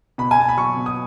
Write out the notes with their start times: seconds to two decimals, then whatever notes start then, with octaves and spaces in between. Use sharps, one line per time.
0.18 B2 B5
0.31 G#5
0.39 B2 A5
0.49 B5
0.57 F#3 C#6
0.77 B2
0.86 D#6